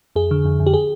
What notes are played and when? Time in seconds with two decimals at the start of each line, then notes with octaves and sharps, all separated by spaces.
0.16 F2 G#4
0.31 D3
0.45 F2
0.60 F2
0.67 G4
0.74 G#4